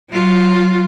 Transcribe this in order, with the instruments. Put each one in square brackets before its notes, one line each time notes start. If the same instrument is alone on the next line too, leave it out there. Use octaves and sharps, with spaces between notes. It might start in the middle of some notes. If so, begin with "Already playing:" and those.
[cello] F#3 F4